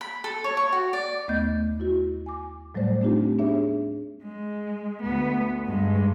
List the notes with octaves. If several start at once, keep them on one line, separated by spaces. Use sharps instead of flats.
B5
A4
C#5
C#6
F#4
D5
D#2 A3 B3 D#5 G6
E4 F#4
G#5 D6
A2 F#3 G3 A3 C5 D5
A3 C4 D4 D#4 F4 G4
B3 D4 G#4 C#5 E5
G#3
D2 B3
G2 G#3